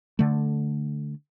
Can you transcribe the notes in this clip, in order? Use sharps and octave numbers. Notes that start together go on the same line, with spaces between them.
D3 A3